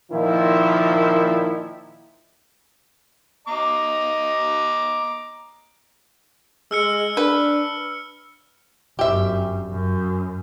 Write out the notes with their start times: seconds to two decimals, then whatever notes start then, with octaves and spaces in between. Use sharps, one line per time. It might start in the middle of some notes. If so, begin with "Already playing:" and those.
0.11 A#2 D#3 F3 E4
3.48 D#5 A#5 D6
6.71 G#3 E6 F6 C#7
7.17 D4 B4
8.99 G1 F#2 G4 E5
9.70 F#2